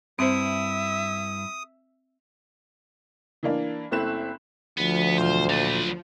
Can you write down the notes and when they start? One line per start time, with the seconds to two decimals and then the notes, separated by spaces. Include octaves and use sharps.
0.19 G2 C4 E4 C5 E5 D#6
3.43 E3 A#3 D4
3.91 F#1 A3 C4 E4 F#6 E7
4.78 D2 F3 B3
5.18 B1 E2 F4 C5
5.49 A#2 F#3 A3 B4